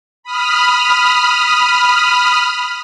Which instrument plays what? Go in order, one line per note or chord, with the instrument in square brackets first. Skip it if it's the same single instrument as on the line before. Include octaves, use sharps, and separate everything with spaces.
[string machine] B5 D#6 F6